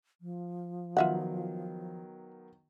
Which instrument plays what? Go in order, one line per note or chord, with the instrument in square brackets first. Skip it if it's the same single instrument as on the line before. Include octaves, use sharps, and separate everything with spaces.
[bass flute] F3
[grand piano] D#3 F#3 B3 [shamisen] F4 E5 F#5